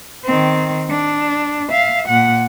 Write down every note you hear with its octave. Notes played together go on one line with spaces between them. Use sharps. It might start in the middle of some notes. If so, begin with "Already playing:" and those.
D#3 C4
D4
E5 F5
A#2 F#5